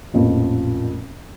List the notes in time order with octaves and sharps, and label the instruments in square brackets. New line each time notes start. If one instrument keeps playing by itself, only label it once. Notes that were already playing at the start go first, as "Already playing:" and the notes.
[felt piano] A1 F2 A#2 F3